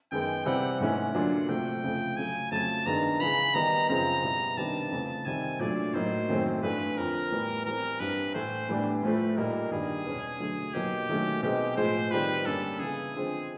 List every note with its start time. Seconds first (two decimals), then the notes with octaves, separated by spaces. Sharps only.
0.12 F#2 D#3 G#3 B3 G5
0.45 C3 E3 G3 C4 E4 F#5
0.80 G#2 E3 A3 C#4 E4 F#5
1.15 D3 F#3 A#3 D4 F4
1.48 C3 F3 A3 G5
1.83 F2 C#3 F3 A3
2.17 C#3 F#3 A3 G#5
2.51 F2 C#3 F#3 A3 A5
2.86 G2 D#3 G#3 B3 D4 A#5
3.20 C#3 E3 G#3 B5
3.54 D#3 G3 B3 D#4 A#5
3.89 F#2 C#3 F3 G#3 C4 A#5
4.23 B2 G3 B3 E4
4.57 C3 D#3 G3 B3 D4 A5
4.91 F2 C#3 E3 A3
5.25 C3 D#3 G3 C4 G#5
5.59 A#2 F#3 A3 D4 D5
5.94 A2 F#3 A#3 D#4 C5
6.29 F#2 D#3 F#3 A3 C4
6.62 G2 E3 A3 D4 B4
6.97 F2 D3 F3 A#4
7.31 A2 E3 G3 B3
7.65 E3 G3 C4 A#4
8.00 G2 E3 G3 C4 B4
8.34 A2 E3 A3 C5
8.69 A2 E3 G3 B3 D4
9.03 A2 F3 A3 B4
9.36 A#2 G3 A#3 D#4 A#4
9.71 G2 D#3 G3 G#4
10.05 E2 B2 G#3 C#4
10.40 D3 F#3 A3
10.73 B2 F#3 A#3 D#4 G4
11.09 D#3 F#3 A3 C#4
11.43 B2 G#3 C4 D#4 G4
11.77 A2 F3 G#3 C5
12.11 D#3 G3 C4 F4 B4
12.46 G2 D3 G3 A#3 C#4 A4
12.79 C#3 E3 G#3 B3 G#4
13.14 D3 F3 G#3 C4